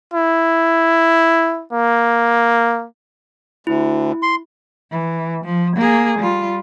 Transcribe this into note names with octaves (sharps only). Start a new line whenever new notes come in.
E4
A#3
D2 E4
C6
E3
F3
A#3 G#4
G3 F4